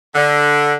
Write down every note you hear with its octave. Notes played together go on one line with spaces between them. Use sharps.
D3